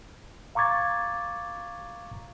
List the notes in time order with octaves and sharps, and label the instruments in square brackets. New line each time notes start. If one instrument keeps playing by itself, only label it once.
[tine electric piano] F5 A#5 C#6 D6 G#6 A6